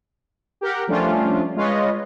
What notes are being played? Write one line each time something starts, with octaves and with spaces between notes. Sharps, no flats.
G4 A#4 F#5
F3 G3 A3 C#4 D4 F4
G#3 F4 B4 C#5 D#5